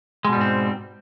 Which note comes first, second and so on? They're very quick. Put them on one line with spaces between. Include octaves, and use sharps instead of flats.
G#3 B2 G3 G#2 C4